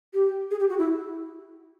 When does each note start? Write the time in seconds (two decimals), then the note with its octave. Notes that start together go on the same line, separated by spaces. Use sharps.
0.14 G4
0.51 G#4
0.60 G4
0.69 F#4
0.79 E4